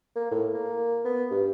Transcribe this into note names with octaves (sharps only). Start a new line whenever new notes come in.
A#3
A2
A#3
B3
G2